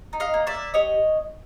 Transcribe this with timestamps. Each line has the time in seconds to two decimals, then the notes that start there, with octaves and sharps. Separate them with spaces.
0.13 D#4
0.20 D#5 F5
0.34 A#3
0.47 D5 E5
0.54 A#3
0.74 G4 C#5 D#5